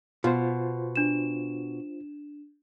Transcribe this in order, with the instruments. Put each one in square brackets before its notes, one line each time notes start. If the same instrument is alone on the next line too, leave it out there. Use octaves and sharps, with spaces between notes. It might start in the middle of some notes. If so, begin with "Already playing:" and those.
[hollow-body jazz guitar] B2 [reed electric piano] F4 C5
[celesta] D4 E7